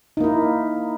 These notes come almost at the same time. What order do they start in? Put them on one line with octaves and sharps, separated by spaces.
D#4 A#3 E4